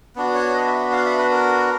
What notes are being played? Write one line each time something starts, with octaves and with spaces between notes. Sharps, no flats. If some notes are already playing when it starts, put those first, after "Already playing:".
B3 D4 F#4
C#5
D#5
E5
F5
E5
B4
A#4